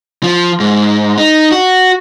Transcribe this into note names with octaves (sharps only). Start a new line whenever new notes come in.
F3
G#2
D#4
F#4